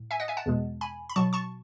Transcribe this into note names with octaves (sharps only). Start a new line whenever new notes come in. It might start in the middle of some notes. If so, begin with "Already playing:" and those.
Already playing: A2
E5 G#5
D#5 F#5
E5 G#5
F#5 A5
E2 B2 G#3
G#5 B5
B5
B2 F#3 A5 C#6
A5 C#6